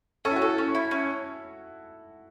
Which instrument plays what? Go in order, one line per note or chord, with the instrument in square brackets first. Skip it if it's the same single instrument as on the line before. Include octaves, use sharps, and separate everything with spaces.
[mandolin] C#4 [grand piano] A4
[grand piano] E4
F#4
[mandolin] A4
C#4
E4
C#4